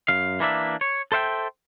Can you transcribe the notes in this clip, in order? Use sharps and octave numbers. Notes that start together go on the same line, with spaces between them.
F#2 F5
E3 A#3 D4 E5
C#5
A4 C5 E5 F#5 G5